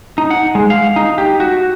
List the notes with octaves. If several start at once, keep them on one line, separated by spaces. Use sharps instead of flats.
D#4
F#5
G#3
F5
D#4
G4
F#4